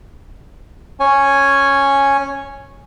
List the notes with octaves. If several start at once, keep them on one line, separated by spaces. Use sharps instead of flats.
C#4 C#5 G#5